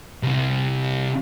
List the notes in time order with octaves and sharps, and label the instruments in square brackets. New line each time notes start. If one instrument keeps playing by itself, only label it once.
[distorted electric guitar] C2 C3